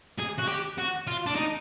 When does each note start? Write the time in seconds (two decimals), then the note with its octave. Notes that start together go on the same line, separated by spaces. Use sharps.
0.19 G#4
0.39 F#4
0.48 G4
0.78 F#4
1.07 F4
1.26 D4
1.36 D#4